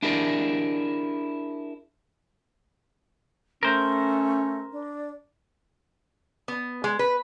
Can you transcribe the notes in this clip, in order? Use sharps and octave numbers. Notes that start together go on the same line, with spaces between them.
D4 E4 G4 G#4 A#4 D5
A3 C#4 A#4 C5
D4
B3
G#3
B4